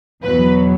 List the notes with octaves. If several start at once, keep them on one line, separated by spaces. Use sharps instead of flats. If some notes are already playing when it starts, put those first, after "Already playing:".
E2 B2 F#3 B4